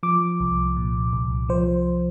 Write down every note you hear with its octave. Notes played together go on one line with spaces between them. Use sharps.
F3 D6
C2
A#2
C2
F3 C5